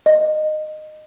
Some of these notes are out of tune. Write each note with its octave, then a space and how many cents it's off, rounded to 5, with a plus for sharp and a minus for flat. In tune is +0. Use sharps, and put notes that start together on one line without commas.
D#5 -15